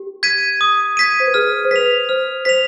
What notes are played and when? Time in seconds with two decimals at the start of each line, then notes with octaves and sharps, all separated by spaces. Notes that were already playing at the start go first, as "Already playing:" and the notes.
Already playing: G4
0.23 G#6 B6 D#7
0.61 D#6
0.97 G#6 B6 D#7
1.20 C5
1.27 B4
1.34 G#4 F6
1.65 C5
1.71 B4 B6 F7
2.09 C5 F6
2.45 C5 B6 F7